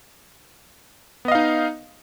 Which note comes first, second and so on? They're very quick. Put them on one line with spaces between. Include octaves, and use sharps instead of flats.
B3 D#5 F5 D#4